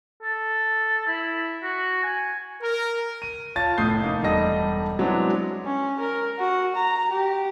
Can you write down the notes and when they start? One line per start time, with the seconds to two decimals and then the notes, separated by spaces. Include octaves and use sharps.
0.23 A4
1.07 E4
1.63 F#4
2.03 G#5
2.61 A#4
3.22 D#7
3.56 F4 C#5 A5 A6
3.78 F1 A2 A3 D#6 G6 C7
4.01 A3 A#3 D#4
4.23 E1 G2 G3 A4 D#5 A#6
4.99 F#3 G#3 B3 C4 D4 E4
5.65 C#4
6.00 A#4
6.39 F#4
6.76 A#5
7.11 G4